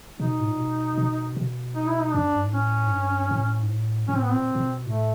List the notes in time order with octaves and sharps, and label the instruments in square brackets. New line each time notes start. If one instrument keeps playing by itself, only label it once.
[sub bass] B2 [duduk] D#4
[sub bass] A2
A#2
B2
B2
B2
[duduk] D#4
E4
D#4
[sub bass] F2 [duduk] D4
[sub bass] F#2
G2
G#2
[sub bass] A2 [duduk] C#4
[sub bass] G#2
G2
A2
G#2
A2
[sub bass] A2 [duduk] C#4
[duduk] C4
B3
[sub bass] A#2 [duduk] C4
[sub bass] A#2
B2
[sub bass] A2 [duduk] A3